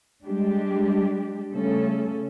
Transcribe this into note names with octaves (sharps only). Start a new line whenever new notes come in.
G3 G#3 D4 G4
C#3 G3 A3 C#4 A4